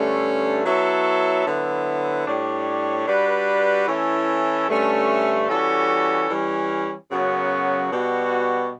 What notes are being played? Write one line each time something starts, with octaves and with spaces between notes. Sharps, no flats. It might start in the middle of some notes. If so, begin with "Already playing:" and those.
Already playing: G2 D3 A3 C#4
F#3 B3 E4 A4 C#5
D3 F#3 B3 E4
A2 G3 D4 G4 C#5
G3 D4 F#4 B4
E3 A3 C#4 E4 A4
G2 D3 A3 C#4
E3 G3 C#4 F#4 A4
E3 G3 C#4
F#2 C#3 F#3 B3 F#4
B2 G3 B3 F#4